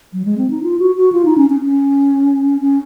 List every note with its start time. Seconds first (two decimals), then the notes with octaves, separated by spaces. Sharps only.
0.13 F#3
0.25 G#3
0.38 C4
0.50 D#4
0.63 F4
0.79 F#4
0.96 F#4
1.12 F4
1.25 D#4
1.38 C#4
1.50 C#4
1.62 C#4
2.61 C#4